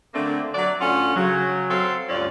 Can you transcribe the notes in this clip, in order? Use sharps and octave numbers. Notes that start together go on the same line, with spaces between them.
D3 A3 A#3 C4 D4
F#3 D5
D2 C#4 F4 A4 F#5
C#3 F#3
F#3 C4 A4 C#5 F5
D2 G2 C#4 F4 D5